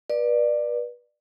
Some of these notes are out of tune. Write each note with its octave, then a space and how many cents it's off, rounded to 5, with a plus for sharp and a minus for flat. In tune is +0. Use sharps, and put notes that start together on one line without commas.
B4 -35 D5 +20